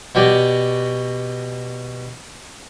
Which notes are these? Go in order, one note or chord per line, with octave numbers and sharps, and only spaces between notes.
B2 F#4 G4 D5 G#5